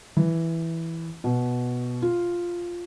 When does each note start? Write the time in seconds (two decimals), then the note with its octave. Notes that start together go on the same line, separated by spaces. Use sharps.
0.17 E3
1.24 B2
2.02 F4